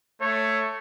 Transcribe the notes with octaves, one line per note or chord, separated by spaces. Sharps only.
A3 C#5